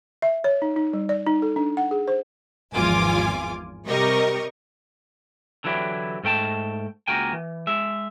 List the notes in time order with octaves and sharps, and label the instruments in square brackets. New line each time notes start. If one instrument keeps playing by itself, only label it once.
[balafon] E5
C#5
D#4
D#4
G3
D5
D#4
A4
D4
F#5
G#4
C5
[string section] G#1 E2 F3 F4 G#5 D6
C3 G3 G4 A#4 D#5 C#6
[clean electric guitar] D3 E3 F#3 E4 G4
G#2 A3 G5 A5
C#2 A#3 F#4 A#4 G5 G#5
E3
G#3 E5